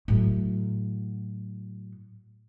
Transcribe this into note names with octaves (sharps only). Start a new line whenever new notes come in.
A2 F#3